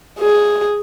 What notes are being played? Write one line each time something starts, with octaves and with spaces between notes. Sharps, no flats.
G#4